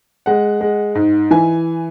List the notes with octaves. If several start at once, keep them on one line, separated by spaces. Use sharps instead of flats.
G#3 F#5
G#3
G#2
E3 G#5